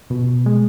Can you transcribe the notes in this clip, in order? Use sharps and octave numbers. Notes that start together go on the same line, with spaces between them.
B2
G#3